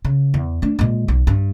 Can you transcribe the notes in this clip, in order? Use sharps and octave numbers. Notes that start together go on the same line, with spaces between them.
C#3
E2
A3 D4
A#2 G#3
B1
G2